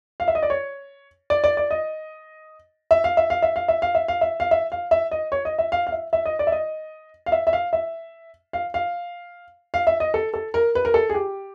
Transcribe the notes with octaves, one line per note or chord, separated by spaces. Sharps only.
F5
E5
D#5
D5
C#5
D5
D5
D5
D#5
E5
F5
E5
F5
E5
F5
E5
F5
E5
F5
E5
F5
E5
F5
E5
D#5
C#5
D#5
E5
F5
F5
E5
E5
D#5
D5
E5
D#5
F5
E5
E5
F5
E5
F5
F5
F5
E5
D#5
A4
A4
A#4
B4
A#4
A4
G#4
G4